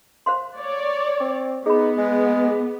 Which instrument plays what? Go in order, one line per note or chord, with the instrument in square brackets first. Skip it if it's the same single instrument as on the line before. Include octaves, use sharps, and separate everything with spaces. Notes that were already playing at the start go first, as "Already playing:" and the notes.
[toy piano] C5 F5 C6
[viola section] C#5 D5
[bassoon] C4
[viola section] B3 [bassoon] D#4 [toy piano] G#4 B5
[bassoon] G#3
[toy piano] G#4